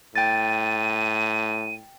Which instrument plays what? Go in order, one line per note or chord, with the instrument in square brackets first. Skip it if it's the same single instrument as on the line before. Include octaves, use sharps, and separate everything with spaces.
[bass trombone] A2 [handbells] G5 A6 [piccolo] D#7